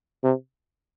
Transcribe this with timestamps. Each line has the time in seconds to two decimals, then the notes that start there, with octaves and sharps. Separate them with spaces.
0.24 C3